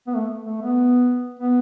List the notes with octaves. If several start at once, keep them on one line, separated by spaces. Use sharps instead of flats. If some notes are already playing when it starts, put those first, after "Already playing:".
B3
A3
A3
B3
B3